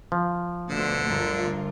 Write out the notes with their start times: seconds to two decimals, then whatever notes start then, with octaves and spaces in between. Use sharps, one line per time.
0.12 F3
0.70 D2 B2 D3 C5
1.10 G1 F4 A#4